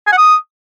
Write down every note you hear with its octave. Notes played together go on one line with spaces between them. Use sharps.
G#5
F#5
D#6